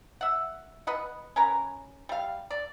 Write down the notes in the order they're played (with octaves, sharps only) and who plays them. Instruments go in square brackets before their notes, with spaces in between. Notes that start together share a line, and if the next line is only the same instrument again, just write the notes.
[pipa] E5 F#5
B4 D#5 F#5
C#4 A#4 B4 A#5
G3 F5
D5